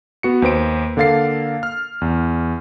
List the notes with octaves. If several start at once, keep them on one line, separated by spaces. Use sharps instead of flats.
B3 F#4 C#7
D#2 B4 C5 D7
D3 A#3 A4 F5 A6 C7
F6
E2